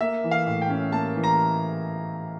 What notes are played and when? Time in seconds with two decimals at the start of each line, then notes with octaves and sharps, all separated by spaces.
0.01 A#3 E5
0.24 E3
0.31 F5
0.47 A2
0.62 G5
0.69 C#4
0.92 A#3 A5
1.16 E3
1.24 A#5